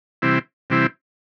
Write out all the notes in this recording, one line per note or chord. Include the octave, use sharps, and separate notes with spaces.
C3 E3 G3 C4 E4
C3 E3 G3 C4 E4